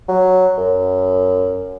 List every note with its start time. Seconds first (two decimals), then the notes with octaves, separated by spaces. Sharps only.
0.08 F#3
0.58 F#2